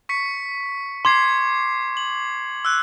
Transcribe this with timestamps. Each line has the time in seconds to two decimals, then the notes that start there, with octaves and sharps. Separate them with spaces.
0.09 C#6 B6 C#7
1.05 C6 D6 G#6 C7
1.97 F#7
2.65 E6 F#6